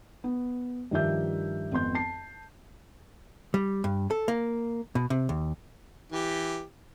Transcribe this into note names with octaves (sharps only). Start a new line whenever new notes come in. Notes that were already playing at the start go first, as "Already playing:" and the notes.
B3
G2 D#3 F3 G4 E5 G6
G#1 F2 B3 C6 G6
A5 C7
G3
G2
A4
A#3
B2
C3
D#2
E3 G4